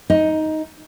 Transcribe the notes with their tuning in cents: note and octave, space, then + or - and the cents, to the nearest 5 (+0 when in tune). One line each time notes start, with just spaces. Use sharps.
D#4 +10